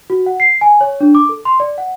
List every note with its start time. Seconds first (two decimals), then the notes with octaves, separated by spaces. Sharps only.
0.10 F#4
0.26 F#5
0.40 C7
0.61 G#5
0.81 C#5
1.01 D4
1.15 D6
1.29 A4
1.45 C6
1.60 D5
1.78 F#5